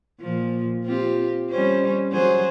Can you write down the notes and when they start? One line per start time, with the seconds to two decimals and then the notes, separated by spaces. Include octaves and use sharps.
0.20 A#2 F3
0.85 C4 F4 G4
1.50 G3 C#4 C5
2.12 F#3 G#4 C5